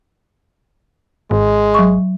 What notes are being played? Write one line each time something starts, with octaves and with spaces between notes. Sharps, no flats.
G#1 G#3
F#3 C#6